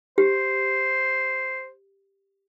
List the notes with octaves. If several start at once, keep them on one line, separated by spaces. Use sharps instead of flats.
G4 C5